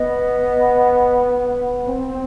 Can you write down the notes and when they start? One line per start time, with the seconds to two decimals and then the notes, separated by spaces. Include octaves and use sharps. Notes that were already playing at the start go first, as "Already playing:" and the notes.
Already playing: B3 D#5
1.86 C4